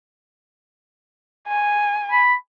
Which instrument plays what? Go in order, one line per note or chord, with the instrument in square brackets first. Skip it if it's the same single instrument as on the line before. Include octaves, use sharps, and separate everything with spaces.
[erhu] G#5
[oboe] B5